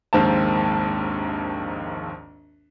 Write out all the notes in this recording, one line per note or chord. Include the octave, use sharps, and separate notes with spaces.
A#1 D#2 G#2 A#3 C4 A5